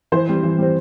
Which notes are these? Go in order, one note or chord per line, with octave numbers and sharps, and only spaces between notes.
E3 C5
G3 C4
E3
G3 C4